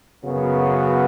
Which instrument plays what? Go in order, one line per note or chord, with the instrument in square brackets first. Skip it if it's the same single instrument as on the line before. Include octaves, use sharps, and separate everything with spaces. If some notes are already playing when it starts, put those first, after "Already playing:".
[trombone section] F#2 C#3 B3 F#4